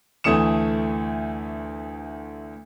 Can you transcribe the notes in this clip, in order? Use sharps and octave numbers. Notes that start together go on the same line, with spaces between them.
D2 E3 A3 D#6 C#7 E7